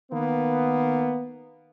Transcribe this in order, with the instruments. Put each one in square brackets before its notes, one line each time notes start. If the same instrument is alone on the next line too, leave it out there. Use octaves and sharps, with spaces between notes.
[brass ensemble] D#3 A#3 B3